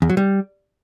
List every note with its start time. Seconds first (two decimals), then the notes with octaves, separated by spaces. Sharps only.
0.02 E2
0.10 F#3
0.17 G3